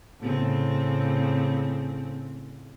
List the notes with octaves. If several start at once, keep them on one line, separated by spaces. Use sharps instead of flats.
A2 C#3 C4